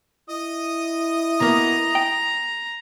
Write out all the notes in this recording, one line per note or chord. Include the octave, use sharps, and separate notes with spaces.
E4 D#5 D#6
B2 A#3 B3 A#5
G5